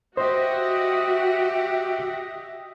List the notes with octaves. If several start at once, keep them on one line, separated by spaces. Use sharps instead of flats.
F#4 G4 C5 D#5 E5 F#5